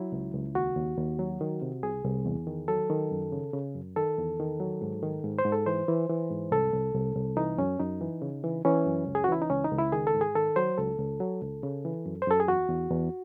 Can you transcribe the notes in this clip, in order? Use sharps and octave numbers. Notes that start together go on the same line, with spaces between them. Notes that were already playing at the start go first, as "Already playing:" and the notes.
Already playing: F#3 E4
C#2
C#2
D#2 F#4
D#2
D#2
F#3
D#3
C3
C2 G#4
C2
E2
D#3
F#3 A4
D#3
F#2
C#3
C#3
F#2
D#3 A4
E2
D#3
F#3
G#2
D#3
G#2
C5
G#2
A4
E3 C5
E3
E3
G#2
C2 A4
C2
C2
C2
E3 D#4
F#2 C#4
F#2 D#4
E3
C#3
E3
E3 C#4
F#2
C#2
G#4
F#4
E3 E4
D#4
C#2 C#4
D#4
C#2
E4
D#3 G#4
A4
G#2
G#4
D#3 A4
F#3 C5
C#2 A4
C#2
F#3
C#2
C#3
E3
F#2
C5
F#2 A4
G#4
E2 F#4
E2
E2